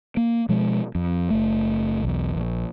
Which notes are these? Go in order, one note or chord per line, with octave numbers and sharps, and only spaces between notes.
A#3
B2 F3 G#3
F2
F#1 A3
B1 E2
A#1